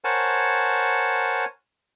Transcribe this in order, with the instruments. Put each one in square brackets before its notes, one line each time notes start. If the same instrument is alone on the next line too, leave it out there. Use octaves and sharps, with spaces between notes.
[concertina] A#4 C5 C#5 F#5 G#5 A5